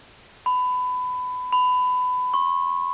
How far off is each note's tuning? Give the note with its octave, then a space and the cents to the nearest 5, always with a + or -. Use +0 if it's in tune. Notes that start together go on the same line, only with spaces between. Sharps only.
B5 +25
B5 +25
C#6 -35